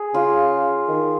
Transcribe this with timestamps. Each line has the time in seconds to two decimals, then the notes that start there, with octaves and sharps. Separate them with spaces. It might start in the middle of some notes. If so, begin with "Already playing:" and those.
Already playing: G#4
0.14 C#3 F4
0.88 D#3